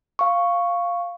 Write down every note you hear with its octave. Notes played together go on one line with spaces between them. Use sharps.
F5 C#6